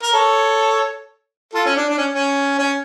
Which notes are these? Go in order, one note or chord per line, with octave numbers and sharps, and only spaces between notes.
A#4
A4 C#5
F4 A4
C#4
D4
D4
C#4
C#4
C#4